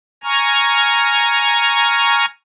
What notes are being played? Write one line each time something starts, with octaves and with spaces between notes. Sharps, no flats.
G#5 A#5 C#6 F6